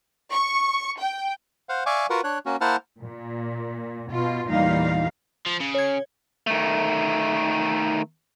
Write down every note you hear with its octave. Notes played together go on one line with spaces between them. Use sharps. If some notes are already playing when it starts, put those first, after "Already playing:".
C#6
G5
C5 F5 F#5
D5 E5 F5 G#5 C#6 D6
F4 F#4 A#4 B4 F#5
D4 C#5 F#6
A#3 C#4 F#4
A#3 E4 C5 F#5 A5 F6
A#2
B2 F4
E2 A#2 E3 G3 D#4 F5
F3
C#3
C#5 G#6
D#3 A3